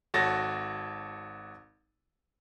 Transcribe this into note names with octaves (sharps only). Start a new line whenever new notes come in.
G#1 F#4 A4 C#5 A6 A#6